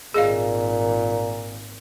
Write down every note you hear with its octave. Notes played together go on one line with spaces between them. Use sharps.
G#1 A#2 G#4 D#5 F5